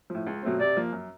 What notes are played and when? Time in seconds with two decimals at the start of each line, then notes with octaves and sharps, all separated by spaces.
0.10 A2 F3
0.27 C#2
0.43 B2 F#3 A3 C4
0.59 C3 D5
0.77 F3 A#3
0.92 F#2